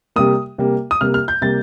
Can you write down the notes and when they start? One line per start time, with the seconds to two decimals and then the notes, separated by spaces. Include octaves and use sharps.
0.16 C3 G3 A#3 D#6
0.58 C3 G3 A#3
0.91 D#6
1.01 C3 G3 A#3 F6
1.14 F6
1.28 G6
1.42 C3 G3 A#3 A6